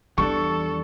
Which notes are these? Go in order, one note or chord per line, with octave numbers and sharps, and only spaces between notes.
E2 E3 G3 D4 A4 C#6